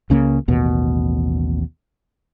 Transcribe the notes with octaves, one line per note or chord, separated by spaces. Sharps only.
C#2 C#3 A3 A#3
A1 D#2 B2